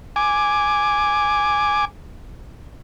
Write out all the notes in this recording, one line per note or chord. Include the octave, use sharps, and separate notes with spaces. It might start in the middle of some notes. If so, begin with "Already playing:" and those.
G#5 D6